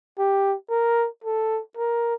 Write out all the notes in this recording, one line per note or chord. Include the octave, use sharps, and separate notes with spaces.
G4
A#4
A4
A#4